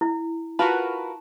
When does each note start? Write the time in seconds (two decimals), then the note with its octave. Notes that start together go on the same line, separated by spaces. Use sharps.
0.01 E4
0.59 F4 F#4 A#4 B4 A5